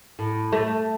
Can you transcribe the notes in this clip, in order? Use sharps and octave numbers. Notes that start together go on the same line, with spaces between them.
A2
A3